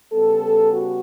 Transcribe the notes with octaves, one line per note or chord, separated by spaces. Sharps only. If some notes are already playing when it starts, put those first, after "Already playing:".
C#3 G3 B3 A4
F#4